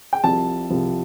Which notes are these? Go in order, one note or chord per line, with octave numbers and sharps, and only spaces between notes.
G5
C2 C3 F3 A5
C2 C3 F3